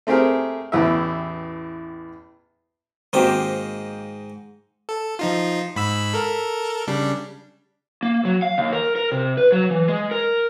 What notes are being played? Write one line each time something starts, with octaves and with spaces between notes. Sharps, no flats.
A3 C4 G4 G#4 A#4
A1 E2 A2 E5
G#2 D#3 A#3 C4 F#4 G4 D#5 G5
A4
F3 D#4 F4
G#2 B5 E6
A4 A#4
C#3 G3 D4
A#3
F#3
F5
D#2
A#4
A#4
C3
B4
F#3
E3
G#3
A#4